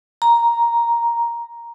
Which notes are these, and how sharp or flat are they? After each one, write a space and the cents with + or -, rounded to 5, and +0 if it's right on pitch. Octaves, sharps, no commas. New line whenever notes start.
A#5 +5